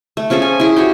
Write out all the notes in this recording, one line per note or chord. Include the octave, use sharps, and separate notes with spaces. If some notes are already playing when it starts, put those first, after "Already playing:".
A3
F3 C#4 G#4 A4
G#5
E4 G#4
F#4 G4 G5